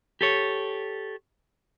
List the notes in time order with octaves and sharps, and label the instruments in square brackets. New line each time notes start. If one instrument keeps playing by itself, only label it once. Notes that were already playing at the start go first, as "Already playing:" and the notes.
[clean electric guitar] G4 A4 C#5